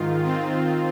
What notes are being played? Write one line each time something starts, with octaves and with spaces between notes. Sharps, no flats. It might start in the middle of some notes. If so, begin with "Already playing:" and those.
Already playing: G#2 D#3 F4
D#3 C4 F4